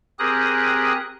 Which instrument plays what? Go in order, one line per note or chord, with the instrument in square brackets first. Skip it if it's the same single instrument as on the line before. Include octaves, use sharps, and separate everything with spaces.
[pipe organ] C4 G4 G#4 A#4 D#6 F#6